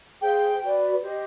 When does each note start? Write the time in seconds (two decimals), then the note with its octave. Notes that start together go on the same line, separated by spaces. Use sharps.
0.21 G#4 C5 F5 G5
0.62 F#4 B4 D5
1.02 G4 C5 D#5